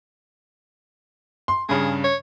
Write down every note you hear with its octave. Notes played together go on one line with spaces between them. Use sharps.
C6
G2 C#3 G#4
C#5